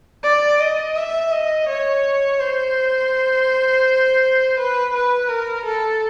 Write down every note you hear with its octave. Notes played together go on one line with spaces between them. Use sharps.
D5
D#5
E5
D#5
C#5
C5
B4
B4
A#4
A4